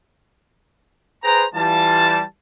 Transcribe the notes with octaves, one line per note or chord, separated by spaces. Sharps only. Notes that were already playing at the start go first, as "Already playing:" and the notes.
G#4 B4 C5 G5 A#5
E3 G3 F4 A5